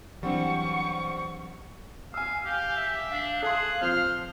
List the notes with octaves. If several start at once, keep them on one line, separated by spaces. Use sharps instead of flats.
E3 F#3 G3 C4 D4 C5 F#5 C#6
F5 G#5 E6
G4 F5
E5
D4 F5
G#4 A4 C6 F#6
F3 C4 C5 F6